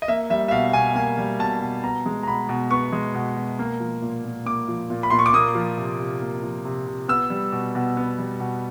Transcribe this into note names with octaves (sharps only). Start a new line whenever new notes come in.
D#5
A#3 E5
G3 E5
E5
B2 F5
B2 G#5
A#3 G#5
G3
B2 A5
B2
B3 A#5
G#3
A#5
B2 B5
B2
B3 C#6
G#3
B2
B2
A#3
F3
A#2
A#2
A#3 D6
F3
A#2
B5
A#2 C6
C#6
D6
A#3 D#6
F3
C3
C3
A#3
F3
C3
C3
B3 E6
G3
B2
B2
B3
G3
B2